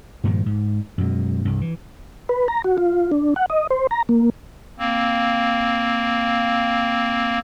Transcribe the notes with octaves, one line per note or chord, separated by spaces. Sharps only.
G2 A#2 D#3 F3
G#2
F#2 B2 G#3
C2 G2
E3
B4
A#5
F#4
F4
D4
F#5
D#5
C5
A#5
A#3
A#3 C4